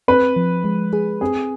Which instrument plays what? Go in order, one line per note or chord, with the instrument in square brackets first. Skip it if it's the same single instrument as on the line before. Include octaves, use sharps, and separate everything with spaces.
[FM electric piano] C4 [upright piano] B4
[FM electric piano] F3
G#3
G#4
[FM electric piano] C4 [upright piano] G#4